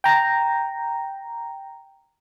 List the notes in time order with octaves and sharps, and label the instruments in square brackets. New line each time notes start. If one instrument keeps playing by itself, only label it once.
[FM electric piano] G5 A#5